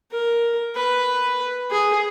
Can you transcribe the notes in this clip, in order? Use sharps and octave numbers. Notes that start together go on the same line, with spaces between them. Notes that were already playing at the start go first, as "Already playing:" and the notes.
A#4
B4
G#4